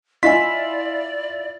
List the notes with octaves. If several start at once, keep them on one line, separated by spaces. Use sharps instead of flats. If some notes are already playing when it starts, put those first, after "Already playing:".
E4 F4 D5 D#5 G#5 C6 B6